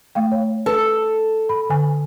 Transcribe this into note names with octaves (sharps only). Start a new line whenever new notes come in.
A3 F5 G5
C#5
A4 B4
B5
D3 G#5